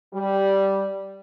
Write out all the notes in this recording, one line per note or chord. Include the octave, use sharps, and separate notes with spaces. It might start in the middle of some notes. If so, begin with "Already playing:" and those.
G3